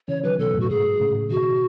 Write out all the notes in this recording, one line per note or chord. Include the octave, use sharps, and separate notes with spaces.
C#3 E3 C#5
D#3 F#3 B4
B2 D#3 A4
F#2 A2
F#4
G#2 G#4
G#2
A2 C#3
A2 C#3
B2 D#3 F#4